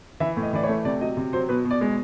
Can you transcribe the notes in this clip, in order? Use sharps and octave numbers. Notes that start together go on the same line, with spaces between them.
E3 E5
A2
D#5
E3 D5
C#5
A3
C3 D5
F#3 D#5
C3
F#3 C5
B2 B4
B2
D5
G#3